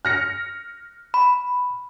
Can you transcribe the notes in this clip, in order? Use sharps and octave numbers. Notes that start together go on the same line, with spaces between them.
F6 A#6 C#7
B5